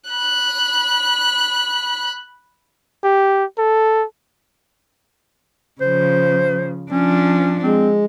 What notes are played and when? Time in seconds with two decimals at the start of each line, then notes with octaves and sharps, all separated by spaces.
0.10 B5 F#6
3.04 G4
3.58 A4
5.81 C#3 F3 C5
6.92 F3 C#4 D4
7.63 G#3 C4